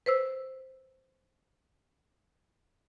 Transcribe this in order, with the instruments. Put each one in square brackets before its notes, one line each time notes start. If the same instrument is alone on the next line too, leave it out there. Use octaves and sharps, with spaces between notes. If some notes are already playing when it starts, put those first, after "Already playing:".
[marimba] B4 C5 E6